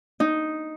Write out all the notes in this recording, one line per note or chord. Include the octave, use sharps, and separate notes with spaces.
D#4